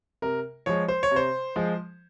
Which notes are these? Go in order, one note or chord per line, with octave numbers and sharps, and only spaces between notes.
C3 A#4
F3 G#3 C#5
C5
C#5
C3
C5
F3 G#3